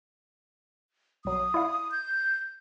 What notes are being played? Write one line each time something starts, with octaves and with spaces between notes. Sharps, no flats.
B1 F#3 D#6
E4 D5 F5
G6